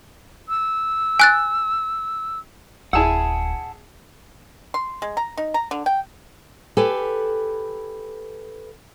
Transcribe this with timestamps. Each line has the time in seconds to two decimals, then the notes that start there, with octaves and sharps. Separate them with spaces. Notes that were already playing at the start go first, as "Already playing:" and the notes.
0.49 E6
1.19 G#5 F#6 A6
2.93 D1 E4 G#4 F#5 A5 E6
4.74 C6
5.02 G#3
5.17 A#5
5.37 D#4
5.54 A#5
5.71 D3
5.86 G5
6.77 G4 A4 B4 G#5